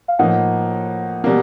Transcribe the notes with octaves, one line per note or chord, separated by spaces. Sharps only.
F5
A2 F3 A#3 D#4 F#5
B2 G3 A#3